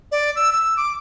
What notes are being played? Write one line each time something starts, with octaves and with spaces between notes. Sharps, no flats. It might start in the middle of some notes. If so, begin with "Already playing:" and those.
D5
E6
E6
D6